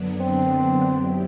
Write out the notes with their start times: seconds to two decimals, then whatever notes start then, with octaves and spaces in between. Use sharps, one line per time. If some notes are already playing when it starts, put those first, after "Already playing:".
Already playing: F#2 D3 F#3 B3 D4
0.21 C4
0.87 F#2 F#3 B3 E4 G4